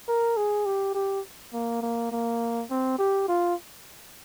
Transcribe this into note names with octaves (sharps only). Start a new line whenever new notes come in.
A#4
G#4
G4
G4
A#3
A#3
A#3
C4
G4
F4